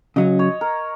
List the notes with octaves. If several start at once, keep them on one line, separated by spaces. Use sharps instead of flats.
C#3 F#3 C#4 D#5
C#5
A#4